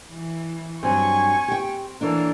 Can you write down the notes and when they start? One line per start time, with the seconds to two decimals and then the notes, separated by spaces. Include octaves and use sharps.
0.10 E3
0.83 G2 F#3 C4 G#5 C#6
1.48 G4 G5
2.01 E3 A#3 D4 A4 C#5